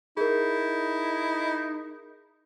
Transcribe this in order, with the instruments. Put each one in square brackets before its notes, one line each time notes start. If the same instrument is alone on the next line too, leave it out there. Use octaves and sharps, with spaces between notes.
[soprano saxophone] D#4 [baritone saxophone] E4 [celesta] G#4 A#4